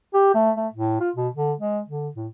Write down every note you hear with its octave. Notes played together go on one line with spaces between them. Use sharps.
G4
A3
A3
A2
F4
B2
D3
G#3
D3
A2